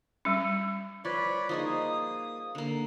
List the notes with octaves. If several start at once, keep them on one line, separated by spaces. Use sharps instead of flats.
G3 C#4
F3 B4 C#5 D5
F3 A#3 D#4 G#4 D#6
D3 A#3